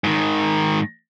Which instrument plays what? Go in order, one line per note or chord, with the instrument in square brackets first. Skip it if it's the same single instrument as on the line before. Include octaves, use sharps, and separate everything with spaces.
[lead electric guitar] G#2 D#3